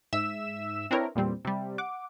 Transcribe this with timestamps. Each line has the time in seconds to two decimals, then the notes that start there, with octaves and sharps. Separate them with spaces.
0.13 G#2 E5 E6 E7
0.91 C4 D4 E4 A#4 B4 C#5
1.15 E2 A#2 G3 C4
1.45 C3 G3
1.78 F#5 D6